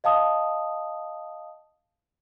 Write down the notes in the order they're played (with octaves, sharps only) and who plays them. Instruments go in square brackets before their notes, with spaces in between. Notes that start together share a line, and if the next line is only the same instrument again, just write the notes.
[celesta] D#5 F5 A5 D#6